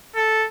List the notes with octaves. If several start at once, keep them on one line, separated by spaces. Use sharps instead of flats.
A4